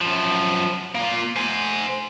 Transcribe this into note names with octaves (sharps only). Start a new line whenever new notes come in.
F#2 F3
A#3 F4
C5 G#5